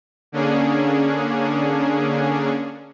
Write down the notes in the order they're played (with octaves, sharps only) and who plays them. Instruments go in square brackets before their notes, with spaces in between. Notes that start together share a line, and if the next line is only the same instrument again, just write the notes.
[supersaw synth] D3 A#3 C#4 D4 G#4